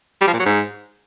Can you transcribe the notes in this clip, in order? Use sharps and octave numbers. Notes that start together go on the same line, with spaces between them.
G3
F3
A#2
F#3
G#2